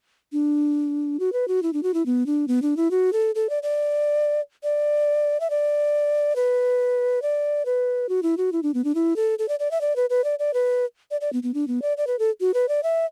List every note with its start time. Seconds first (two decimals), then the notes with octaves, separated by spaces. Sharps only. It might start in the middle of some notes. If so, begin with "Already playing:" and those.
0.32 D4
1.20 F#4
1.33 B4
1.48 F#4
1.63 E4
1.73 D4
1.83 F#4
1.94 E4
2.06 B3
2.26 D4
2.48 B3
2.62 D4
2.77 E4
2.91 F#4
3.13 A4
3.35 A4
3.50 D5
3.63 D5
4.63 D5
5.40 E5
5.50 D5
6.36 B4
7.22 D5
7.66 B4
8.09 F#4
8.23 E4
8.37 F#4
8.52 E4
8.63 D4
8.74 B3
8.84 D4
8.95 E4
9.16 A4
9.39 A4
9.49 D5
9.60 D5
9.71 E5
9.81 D5
9.96 B4
10.10 B4
10.24 D5
10.39 D5
10.54 B4
11.11 D5
11.21 D5
11.33 B3
11.43 B3
11.54 D4
11.68 B3
11.82 D5
11.97 D5
12.07 B4
12.19 A4
12.41 F#4
12.54 B4
12.69 D5
12.83 E5